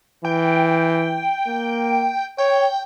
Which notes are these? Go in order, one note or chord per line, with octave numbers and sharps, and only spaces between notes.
E3 G5
A#3
C#5 G5